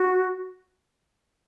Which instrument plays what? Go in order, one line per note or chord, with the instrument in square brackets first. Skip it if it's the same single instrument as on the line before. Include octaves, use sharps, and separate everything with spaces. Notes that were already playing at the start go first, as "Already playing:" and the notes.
Already playing: [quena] F#4